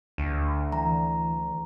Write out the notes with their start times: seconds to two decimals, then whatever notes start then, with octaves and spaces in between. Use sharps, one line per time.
0.18 D2
0.72 E3 A#5